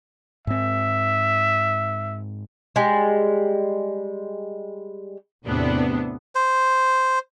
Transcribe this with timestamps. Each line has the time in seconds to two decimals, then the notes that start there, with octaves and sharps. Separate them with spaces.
0.47 G#2 C4 E5
2.76 G3 G#3
5.46 E2 A2 C3 B3 D4
6.35 C5